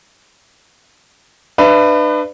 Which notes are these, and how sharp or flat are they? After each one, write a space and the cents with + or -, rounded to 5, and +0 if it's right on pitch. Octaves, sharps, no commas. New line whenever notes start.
D4 +40 B4 +15 E5 +35